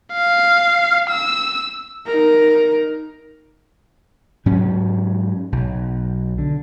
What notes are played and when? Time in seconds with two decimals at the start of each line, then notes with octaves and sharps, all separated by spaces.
0.13 F5
1.10 E6
2.07 D#4 A#4
4.46 G#2 F#3 C#4
5.52 B1
6.38 D3